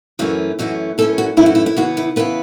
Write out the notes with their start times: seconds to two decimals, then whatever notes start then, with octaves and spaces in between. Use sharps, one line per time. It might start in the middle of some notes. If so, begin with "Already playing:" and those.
0.19 F#2 E3 A3 C#4 F#4
0.59 F#2 E3 A3 C#4 F#4
0.98 F#2 E3 A3 C#4 A4
1.18 F#4
1.37 F#2 E3 A3 C#4 E4
1.46 F#4
1.55 E4
1.66 E4
1.76 C#3 E3 B3 F#4
1.97 E4
2.16 C#3 E3 B3 B4